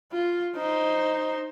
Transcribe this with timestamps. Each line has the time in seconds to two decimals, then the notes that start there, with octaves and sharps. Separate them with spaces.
0.12 F4
0.56 D#4 C5